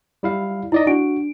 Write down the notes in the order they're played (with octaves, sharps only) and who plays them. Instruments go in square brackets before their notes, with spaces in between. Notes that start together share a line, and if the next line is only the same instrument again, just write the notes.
[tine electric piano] G3 E4 F5
[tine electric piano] D#4 D5 D#5 [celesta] E4
[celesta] D4 D7 [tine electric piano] F#4